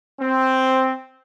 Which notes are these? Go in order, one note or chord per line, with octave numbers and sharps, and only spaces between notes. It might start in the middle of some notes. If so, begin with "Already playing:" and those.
C4